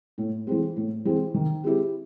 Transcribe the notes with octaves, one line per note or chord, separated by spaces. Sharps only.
A2
E3 G#3 C4
A2
E3 G#3 C4
D#3
G#3 C4 E4 G4